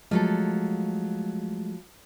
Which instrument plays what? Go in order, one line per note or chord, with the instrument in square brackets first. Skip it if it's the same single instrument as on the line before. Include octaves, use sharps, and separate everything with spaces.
[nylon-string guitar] F3 F#3 A4 [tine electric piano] G#3 A3